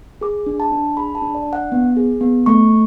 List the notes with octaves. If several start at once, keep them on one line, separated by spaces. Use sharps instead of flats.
G#4 D6
D4
A5
D4
G#4 B5
A5
D4
D5
D4
F#5
B3
G#4
B3
A3 C#6